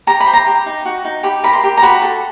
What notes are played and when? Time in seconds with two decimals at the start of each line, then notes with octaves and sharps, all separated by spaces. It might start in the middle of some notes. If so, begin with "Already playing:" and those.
0.07 G4 A#5
0.20 B5
0.26 C5
0.33 A#5
0.46 G4
0.66 D#4
0.85 F#4
1.05 D#4
1.23 G4 B5
1.44 A#4 B5
1.53 C6
1.64 G4
1.77 A#5
1.82 F#4 B5
2.02 A4